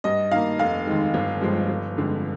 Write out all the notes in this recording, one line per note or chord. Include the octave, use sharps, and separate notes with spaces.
G2 D#5
D#3 A#3 F5
F1 F5
D#2 D#3 G#3
G1
G2 F3 G#3
G1
F2 D3 G#3